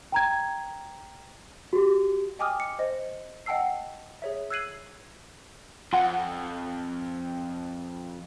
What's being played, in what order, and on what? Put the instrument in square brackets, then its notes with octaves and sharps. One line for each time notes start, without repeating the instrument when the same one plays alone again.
[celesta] G5 A#5 G#6
F#4 G4
[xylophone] D#5 G5 G#5 D6 D#6 F6
C#7
C5 D#5
D#5 F#5 G5 A5 E6 C7
G#4 C#5 E5
E6 F#6 G#6 C7 D#7 F#7
[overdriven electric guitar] F2 [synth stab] F4 F#5